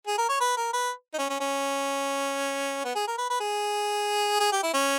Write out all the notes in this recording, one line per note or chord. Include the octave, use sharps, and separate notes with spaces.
G#4
A#4
C#5
B4
A#4
B4
D#4
C#4
C#4
C#4
B3
G#4
A#4
B4
B4
G#4
G#4
G4
E4
C#4